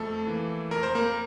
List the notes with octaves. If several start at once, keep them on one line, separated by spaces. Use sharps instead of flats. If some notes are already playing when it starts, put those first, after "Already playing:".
Already playing: F2 A3 A4
E3 A#3
F2 A#4
C5
A#3 A#4